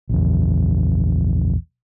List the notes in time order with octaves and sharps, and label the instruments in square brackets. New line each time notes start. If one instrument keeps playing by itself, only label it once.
[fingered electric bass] A#1 E2